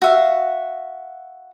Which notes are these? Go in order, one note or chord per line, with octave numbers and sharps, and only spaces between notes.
F#4 E5 F5